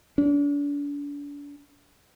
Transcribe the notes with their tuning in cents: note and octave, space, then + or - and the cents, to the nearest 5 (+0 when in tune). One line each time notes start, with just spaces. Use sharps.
D4 -35